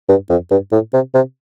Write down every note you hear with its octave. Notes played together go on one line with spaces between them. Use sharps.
G2
F2
G2
A2
C3
C3